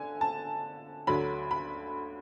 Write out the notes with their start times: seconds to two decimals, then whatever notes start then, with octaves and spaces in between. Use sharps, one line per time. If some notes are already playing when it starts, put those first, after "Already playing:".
Already playing: D3 G#5
0.21 A5
1.07 D2 D3 F#3 B5
1.51 B5